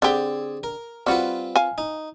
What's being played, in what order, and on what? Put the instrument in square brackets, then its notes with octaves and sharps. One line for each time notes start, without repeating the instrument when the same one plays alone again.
[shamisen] D3 G4 [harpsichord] C4 G#4 D5
[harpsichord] A#4
[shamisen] G3 F#4 [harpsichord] C4 F4 B4
[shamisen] F5 G#5
[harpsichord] D#4